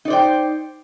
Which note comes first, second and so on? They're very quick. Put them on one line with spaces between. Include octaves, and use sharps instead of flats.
D#4 D5 C5 G5